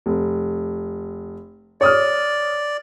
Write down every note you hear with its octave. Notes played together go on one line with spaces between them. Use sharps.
F1
C#5 D5 D#6 F6